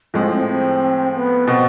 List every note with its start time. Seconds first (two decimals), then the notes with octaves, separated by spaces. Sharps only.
0.14 A2 F3 G#3 C4
0.31 C4
0.48 C4
1.15 B3
1.47 B2 C4